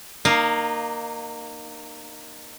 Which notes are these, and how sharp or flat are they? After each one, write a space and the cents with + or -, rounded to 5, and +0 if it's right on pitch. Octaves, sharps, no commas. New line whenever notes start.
A#3 +0 D#4 -30 F5 +0